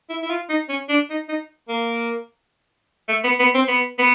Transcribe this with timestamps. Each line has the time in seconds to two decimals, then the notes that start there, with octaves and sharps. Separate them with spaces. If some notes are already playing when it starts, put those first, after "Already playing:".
0.10 E4
0.23 E4
0.30 F4
0.50 D#4
0.69 C#4
0.89 D4
1.10 D#4
1.29 D#4
1.69 A#3
3.09 A3
3.24 B3
3.40 B3
3.55 C4
3.68 B3
3.99 B3